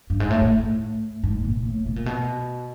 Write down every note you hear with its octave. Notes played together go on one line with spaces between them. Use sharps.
G2
G#2
A2
A2
G#2
A#2
A2
B2
A#2
B2